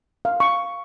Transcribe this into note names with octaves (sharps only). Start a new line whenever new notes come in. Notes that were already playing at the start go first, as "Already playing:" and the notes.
F5
C#6